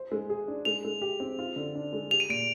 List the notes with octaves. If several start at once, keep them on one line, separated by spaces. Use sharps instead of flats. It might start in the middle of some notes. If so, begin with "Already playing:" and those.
Already playing: C5
G#3
G#4
D4
G#3 F7
G#3
G4
C4
F4
D3
D4
G#3
G4 F7
D#7
A#2 D7